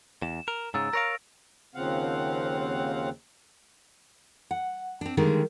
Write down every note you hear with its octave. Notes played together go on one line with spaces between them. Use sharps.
E2 E7
A#4
G#2 C#3 A#5 E6 A6
A#4 C#5 F5 A#6 D7
D#2 C#3 F3 C4 F5 F#5
F#5
C4 D4
D3 D#3 G3 G#3 A#3